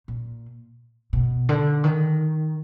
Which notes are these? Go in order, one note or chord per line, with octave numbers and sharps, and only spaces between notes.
A#2
B2
D3
D#3